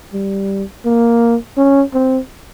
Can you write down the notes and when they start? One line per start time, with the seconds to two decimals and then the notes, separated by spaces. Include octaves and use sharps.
0.13 G3
0.85 A#3
1.57 C#4
1.94 C4